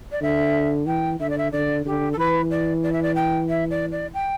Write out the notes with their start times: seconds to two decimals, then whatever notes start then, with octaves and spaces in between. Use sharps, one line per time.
0.12 D5
0.22 D3 E5
0.87 E3 G5
1.20 D3 E5
1.30 D5
1.38 E5
1.52 D3 D5
1.86 D3 G4
2.13 A4
2.18 E3 B4
2.51 D5
2.83 D5
2.93 E5
3.02 D5
3.15 G5
3.49 E5
3.70 D5
3.92 D5
4.14 G5